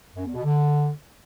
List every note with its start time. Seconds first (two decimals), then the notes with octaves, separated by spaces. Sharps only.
0.16 F#2
0.25 E2
0.34 B2
0.43 D3